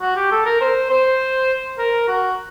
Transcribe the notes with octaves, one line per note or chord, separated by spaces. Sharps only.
F#4
G4
A4
A#4
C5
C5
A#4
F#4